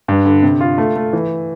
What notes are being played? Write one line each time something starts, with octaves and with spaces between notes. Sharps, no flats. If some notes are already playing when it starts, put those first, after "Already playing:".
G2
D3
C3
F4
A3
A3
E3